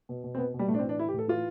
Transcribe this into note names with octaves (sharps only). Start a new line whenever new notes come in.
B2
B2
C4
B2 B3
B2
G3
A2 A3
D4
C4
E3
D4
E3 E4
G4
A2
A4
E3 F4